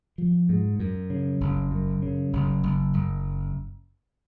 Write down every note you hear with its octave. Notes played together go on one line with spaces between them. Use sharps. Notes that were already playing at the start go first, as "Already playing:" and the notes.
F3
G#2
F#2
C#3
F#1
F#2
C#3
F#1
F#1
F#1